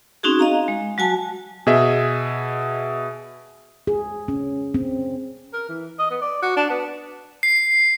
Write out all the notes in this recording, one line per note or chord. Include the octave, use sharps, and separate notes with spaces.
C4 C#4 D#4 F#4 G#4
D#5 F5 A#5
G#3
F#3 F#4 G#5 A5
B2 G#4 D#5 E5
G#4
C#4
C4
A#4
E3
D#5
B3
D5
F#4
D4
B3
C7